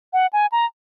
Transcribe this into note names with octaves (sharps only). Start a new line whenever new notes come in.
F#5
G#5
A#5